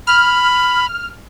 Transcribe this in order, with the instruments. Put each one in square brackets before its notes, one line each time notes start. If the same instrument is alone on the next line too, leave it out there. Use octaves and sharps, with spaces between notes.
[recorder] B5 [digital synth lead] F6